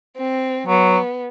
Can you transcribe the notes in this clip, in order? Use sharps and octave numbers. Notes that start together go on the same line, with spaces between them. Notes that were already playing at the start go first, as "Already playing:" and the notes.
C4
F#3 B3